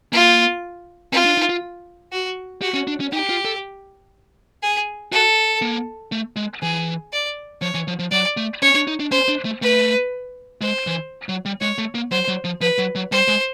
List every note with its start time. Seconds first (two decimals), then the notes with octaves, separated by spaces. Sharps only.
0.12 A#3 F4
1.12 C4 F4
1.25 D4
1.38 D#4
1.49 F4
2.12 F#4
2.62 F#4 G4
2.74 C#4
2.87 D4
3.00 C#4
3.12 D#4 G4
3.29 F4
3.45 A4
4.63 G#4
5.12 F#4 A4
5.62 A#3
6.12 A3
6.36 G#3
6.62 E3 G#4
7.12 D5
7.62 F3 C#5
7.74 E3
7.87 F3
7.99 F3
8.11 F#3 D5
8.37 A3
8.62 C#4 C#5
8.75 D4
8.87 D#4
9.00 D4
9.11 C#4 C5
9.28 D4
9.45 A3
9.62 A3 B4
10.61 G#3 C5
10.87 E3
11.29 F#3
11.45 G3
11.61 G#3 C#5
11.78 A3
11.95 A#3
12.11 F#3 C5
12.28 F#3
12.44 F3
12.61 F3 B4
12.78 F#3
12.95 F#3
13.12 G3 C5
13.28 G#3